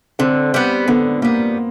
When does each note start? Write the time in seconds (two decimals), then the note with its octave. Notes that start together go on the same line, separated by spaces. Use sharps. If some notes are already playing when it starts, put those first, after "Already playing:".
0.19 D3 C4
0.54 G3 B3
0.88 D3 B3
1.22 G3 A#3 B3